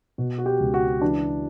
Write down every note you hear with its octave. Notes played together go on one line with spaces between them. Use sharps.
B2 F#4
F#4
G4
C#2
F#4
E3 D4